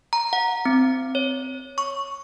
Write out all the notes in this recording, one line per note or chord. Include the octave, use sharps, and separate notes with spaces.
A#5
F#5
C4
C#5
C#6